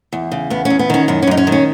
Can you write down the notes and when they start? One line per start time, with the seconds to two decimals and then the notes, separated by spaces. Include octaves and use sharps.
0.13 E2
0.32 C#3
0.50 E2 B3
0.65 C#4
0.70 E2
0.79 B3
0.90 D#3 C#4
1.08 F#2 B3
1.22 C#4
1.27 F#2 D#4
1.37 C#4
1.47 D#3
1.52 C#4